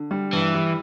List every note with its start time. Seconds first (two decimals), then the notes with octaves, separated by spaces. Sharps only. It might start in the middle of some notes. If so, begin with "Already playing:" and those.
Already playing: D3
0.11 G3
0.33 G2 E3
0.54 G3